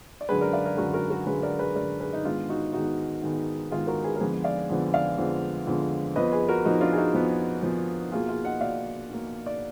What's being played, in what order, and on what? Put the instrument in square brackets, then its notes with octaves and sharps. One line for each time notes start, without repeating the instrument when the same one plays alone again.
[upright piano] D5
F#2 D3 G#3 G#4 B4
A#4 D5
D5 F5
A#4 D5
F#2 D3 G#3 F#4 A#4
F#4 A#4
F#4 A#4
F#2 D3 G#3 G#4 B4
A#4 D5
G#4 B4
F#2 D3 G#3 A#4 D5
G#4 B4
D#4
G#2 D#3 G#3 B3 D4 F4
D#4 F#4
G#2 D#3 G#3 B3 D#4 F#4
G#2 D#3 G#3 B3
G#2 D#3 G#3 B3 F4 G#4
F#4 A#4
G#4 B4
A#4
F2 D3 F3 G#3 B3 G#4 B4
D5 F5
F2 D3 F3 G#3 B3
D5 F5
F2 D3 F3 G#3 B3
F2 D3 F3 G#3 B3
F2 F3 B3 B4 D#5
G#4 B4
F#4 A#4
F2 F3 B3 D#4 F#4
D4 F4
G#4
D#4 F#4
F2 F3 B3
F2 F3 B3
B2 A#3 F4 G#4
F4 G#4
D#5 F#5
B2 A#3 D5 F5
B2 A#3
D5